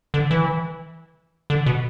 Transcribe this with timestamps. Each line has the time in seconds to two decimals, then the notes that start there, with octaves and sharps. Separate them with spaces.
0.14 D3
0.31 E3
1.50 D3
1.66 B2